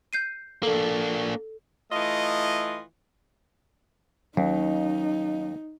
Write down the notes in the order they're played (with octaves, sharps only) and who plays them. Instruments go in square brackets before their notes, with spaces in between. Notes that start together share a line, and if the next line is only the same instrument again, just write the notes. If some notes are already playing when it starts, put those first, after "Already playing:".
[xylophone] G6 C7 D#7
[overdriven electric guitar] A#3 D4 [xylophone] A4
[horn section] E3 A3 F4 D#5
[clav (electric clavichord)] D#2 [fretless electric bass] F#3 C#4 [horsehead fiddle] D#4